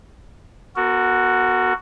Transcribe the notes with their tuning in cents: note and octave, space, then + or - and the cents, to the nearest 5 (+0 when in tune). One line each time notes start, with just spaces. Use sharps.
B3 +0 F#4 +0 A#4 -40